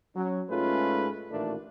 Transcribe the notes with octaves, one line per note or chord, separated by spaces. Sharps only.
F#3 C#4
G#2 G#3 A3 C#4 F4 B4
A1 A#2 D#3 A3 A#3 D4